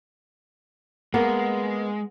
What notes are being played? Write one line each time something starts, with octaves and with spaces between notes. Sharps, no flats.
G#3 A#3 B3 A#4